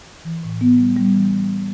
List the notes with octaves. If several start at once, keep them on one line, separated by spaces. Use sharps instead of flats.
E3
A2
B3
G3
G3
E3